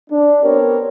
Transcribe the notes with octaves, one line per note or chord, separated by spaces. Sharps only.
D4
B3 C4 G4 A#4 C#5